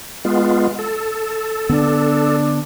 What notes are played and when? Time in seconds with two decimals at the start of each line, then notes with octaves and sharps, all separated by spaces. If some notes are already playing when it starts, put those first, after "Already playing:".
0.25 G#3 B3 F4
0.79 A4
1.69 D3 B3 D4